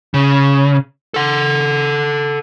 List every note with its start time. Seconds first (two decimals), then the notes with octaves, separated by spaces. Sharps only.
0.14 C#3
1.14 A4 F#5